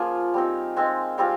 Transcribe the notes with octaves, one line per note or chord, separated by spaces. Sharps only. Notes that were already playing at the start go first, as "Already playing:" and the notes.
Already playing: F3 A#3 C#4 F4 G#4
G3 C4 D#4
G#3 C4 D#4
G3 C4 F4 G#4